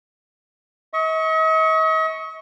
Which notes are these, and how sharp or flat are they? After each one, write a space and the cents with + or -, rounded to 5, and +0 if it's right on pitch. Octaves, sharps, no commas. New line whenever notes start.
D#5 +45 C#6 +0